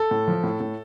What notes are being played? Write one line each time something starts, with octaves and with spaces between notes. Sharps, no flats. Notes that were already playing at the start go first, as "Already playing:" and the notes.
Already playing: A4
A2
F3
A2
A2